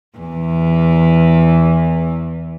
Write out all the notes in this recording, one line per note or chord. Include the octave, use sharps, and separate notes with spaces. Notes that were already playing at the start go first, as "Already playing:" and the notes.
E2 E3